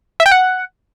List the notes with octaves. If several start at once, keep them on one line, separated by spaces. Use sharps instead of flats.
E5
G5
F#5